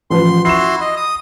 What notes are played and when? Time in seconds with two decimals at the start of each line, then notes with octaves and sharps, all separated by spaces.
0.10 A1 F3 B4 C6
0.45 E4 F#4 C6 C7 E7
0.81 D#5
0.97 D#6